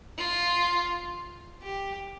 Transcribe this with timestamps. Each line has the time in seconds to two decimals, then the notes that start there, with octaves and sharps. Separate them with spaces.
0.18 F4
1.63 G4